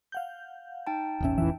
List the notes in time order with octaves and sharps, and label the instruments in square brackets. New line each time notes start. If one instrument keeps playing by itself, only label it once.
[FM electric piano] F5 F#5 G6
[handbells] D#4 G5 A5
[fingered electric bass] E1 A1 C#4 [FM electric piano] E2 E5
[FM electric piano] F2 E5 [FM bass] E3